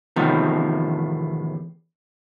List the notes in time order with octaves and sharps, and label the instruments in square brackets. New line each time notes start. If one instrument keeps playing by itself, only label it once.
[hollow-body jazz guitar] E2 A2 C3 D#3 F3